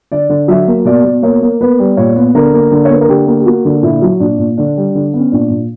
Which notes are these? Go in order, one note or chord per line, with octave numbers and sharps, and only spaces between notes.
D3 D5
D3
F#3 E5
A#3
B2 D5
B2
A#3 C#5
A#3
B3 B4
G3
A#2 C#5
B3
D3 A#4
A#3
D3
C#5
A#3 B4
A#4
D3 G4
A#3
G4
A#3 F#4
D3
A#2 E4
F#3
A#2 D4
A#2
D3 D4
G3
D3
B3
C#4
A#2 D4
A#2